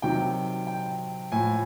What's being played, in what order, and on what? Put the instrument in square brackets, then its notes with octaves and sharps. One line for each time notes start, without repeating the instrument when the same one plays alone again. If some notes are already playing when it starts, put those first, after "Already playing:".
[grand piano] C3 D#3 F#3 G5
G5
A2 F3 G#5